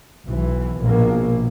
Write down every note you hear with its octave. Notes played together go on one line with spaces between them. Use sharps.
B1 E3
A#1 B2 A#3